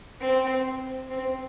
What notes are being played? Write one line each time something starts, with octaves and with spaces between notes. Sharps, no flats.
C4
C4